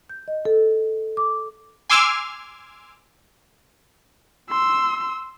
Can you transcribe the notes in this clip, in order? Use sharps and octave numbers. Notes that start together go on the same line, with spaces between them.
G6
D#5
A4
D6
G#5 C6 D6 E6 F6 G#6
C6 E6